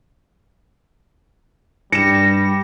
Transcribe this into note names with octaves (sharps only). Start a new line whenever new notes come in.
G2 G3 A#6 C#7 E7